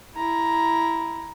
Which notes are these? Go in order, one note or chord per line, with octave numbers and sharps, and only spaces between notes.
E4 A#5